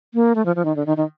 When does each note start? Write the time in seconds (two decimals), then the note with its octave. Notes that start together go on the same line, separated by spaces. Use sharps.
0.14 A#3
0.35 A3
0.46 F3
0.56 F3
0.65 D#3
0.76 D3
0.86 D#3
0.97 D#3